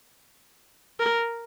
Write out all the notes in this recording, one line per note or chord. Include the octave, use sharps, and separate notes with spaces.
A#4